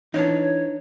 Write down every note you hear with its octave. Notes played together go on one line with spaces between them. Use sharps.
E3 D4 D#4 C#5